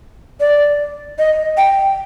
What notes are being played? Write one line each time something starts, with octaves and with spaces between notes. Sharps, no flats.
D5
D#5
G5